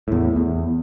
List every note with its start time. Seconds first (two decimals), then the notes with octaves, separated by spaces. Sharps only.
0.08 E2 A2
0.36 E2